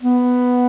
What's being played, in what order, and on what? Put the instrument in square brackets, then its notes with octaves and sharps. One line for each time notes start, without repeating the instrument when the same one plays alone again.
[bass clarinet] B3